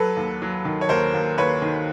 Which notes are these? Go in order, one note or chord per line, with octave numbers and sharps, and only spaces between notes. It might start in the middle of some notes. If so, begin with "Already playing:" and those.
Already playing: F#3 A4 B4
D#2
F#3
D#3
C#5
D#2 A#4 C5
D#2
D#2 B4 C#5
D#3